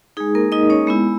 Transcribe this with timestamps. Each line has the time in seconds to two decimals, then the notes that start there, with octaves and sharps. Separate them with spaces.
0.17 G#3 D#4 G#4
0.35 A#3 A#4
0.52 D#4 D#5
0.70 C#4 C#5
0.87 G#3 B3 E4